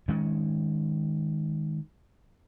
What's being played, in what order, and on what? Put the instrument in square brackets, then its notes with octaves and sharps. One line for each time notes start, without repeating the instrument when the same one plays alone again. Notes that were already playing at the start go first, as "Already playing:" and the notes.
[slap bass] D#3 G#3 C#4